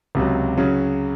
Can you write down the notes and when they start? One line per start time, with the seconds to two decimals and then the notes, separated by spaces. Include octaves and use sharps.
0.15 C#2 C3 F#3
0.58 C#3 F#3 C#4